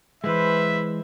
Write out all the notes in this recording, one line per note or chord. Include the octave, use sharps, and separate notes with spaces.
E3 G#3 B4 C5 E5